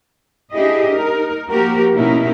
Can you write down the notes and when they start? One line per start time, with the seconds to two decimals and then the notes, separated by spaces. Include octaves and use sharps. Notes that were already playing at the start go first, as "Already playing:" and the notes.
0.52 D4 E4 G4 G#4 D#5
0.94 D#4 A#4
1.50 F3 A#3 F#4 G4 A#4
1.94 B2 A#3 C#4 D#4 E4 A#4